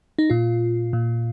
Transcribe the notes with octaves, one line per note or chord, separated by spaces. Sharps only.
D#4
A#2 F4
A#2